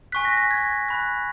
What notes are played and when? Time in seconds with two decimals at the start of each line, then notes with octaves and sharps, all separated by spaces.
0.12 G#5 C#6 F#6 B6
0.25 A#6
0.37 A#6
0.51 G#6
0.89 B5 F#6